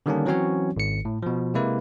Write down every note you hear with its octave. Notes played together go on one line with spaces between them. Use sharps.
D3 D#3 G3 A#3 C#4 D4
E3 F#3 C4 C#4 F#4 C#5
G#1 C#7
A2
B2 F3
C3 G#3 A#3 E4 B4